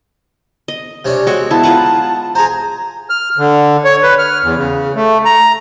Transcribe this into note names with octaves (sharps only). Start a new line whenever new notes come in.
D#5
C3 C#4 D4
G#3 C4 F#4 C#6
B3 E4 A5
F4 B4 F#5 A#5
G#4 C5 A#5
F6
D3
C#5
B4
F6
E2
C#3
A3
A#5